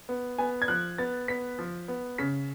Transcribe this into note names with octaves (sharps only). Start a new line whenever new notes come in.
B3
B3 G#5
G#6
F3 F#6
B3 A6
B3 B6
F3
B3
C#3 B6